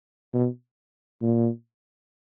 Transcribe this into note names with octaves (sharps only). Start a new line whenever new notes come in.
B2
A#2